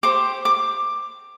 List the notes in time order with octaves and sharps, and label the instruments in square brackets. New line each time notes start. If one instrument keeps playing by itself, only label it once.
[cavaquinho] G4 C5 D6
D6